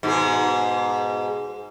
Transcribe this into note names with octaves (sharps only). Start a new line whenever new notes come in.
G#2 B2 G#4